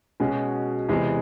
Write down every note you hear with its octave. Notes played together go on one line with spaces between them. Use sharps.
B2 G#3 C#4 F#4
E2 C3 E3 G#3